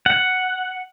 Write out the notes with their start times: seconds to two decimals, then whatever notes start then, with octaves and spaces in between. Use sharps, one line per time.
0.06 F#5